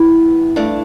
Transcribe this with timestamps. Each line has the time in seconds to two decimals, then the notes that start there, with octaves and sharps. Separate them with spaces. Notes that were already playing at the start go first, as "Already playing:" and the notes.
Already playing: A2 E3 B3 E4
0.56 G2 E3 A3 D4